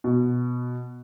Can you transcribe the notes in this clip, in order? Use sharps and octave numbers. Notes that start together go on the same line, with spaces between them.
B2